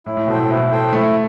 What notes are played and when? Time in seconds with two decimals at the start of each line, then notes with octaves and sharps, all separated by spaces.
0.06 A2 E4
0.17 A2
0.28 B2 A4 C5 G5
0.38 A2
0.50 B2 E4
0.72 A4 C5 G5
0.93 A3 E4